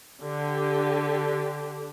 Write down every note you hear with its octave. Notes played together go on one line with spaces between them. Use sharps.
D3 G4